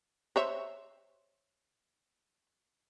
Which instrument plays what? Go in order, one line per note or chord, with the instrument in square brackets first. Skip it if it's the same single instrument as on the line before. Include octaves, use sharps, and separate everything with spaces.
[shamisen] C5 C#5 E5